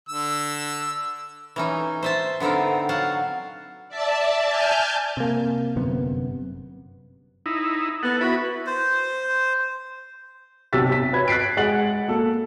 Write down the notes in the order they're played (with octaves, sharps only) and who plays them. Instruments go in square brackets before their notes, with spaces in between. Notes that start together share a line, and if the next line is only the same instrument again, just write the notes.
[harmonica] D3 E6
[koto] E3 C#4 D#4
C5 E5 A5
D3 B3 C4 D#4 A#4
F#3 F5 F#5 A5
[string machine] D5 E5 A5
G#5 A5 F6 G6
[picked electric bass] C3 A#3
G1 F#2 C3 B3
[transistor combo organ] D#4 E4
[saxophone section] B3 [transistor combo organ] A4 F#5
[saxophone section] E4 F#4 B4
[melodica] C5
[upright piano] B1 C3 E6 A6 B6
B6
B4 C#5 B5 G#6
F#6 A6 B6 C7 D7
G#3 F#5 F#6 A6 F#7
A#3 A4